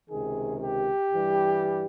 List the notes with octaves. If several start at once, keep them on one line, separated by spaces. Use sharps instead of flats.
C#2 C3 D#3 G#4
G4
G2 E3 G3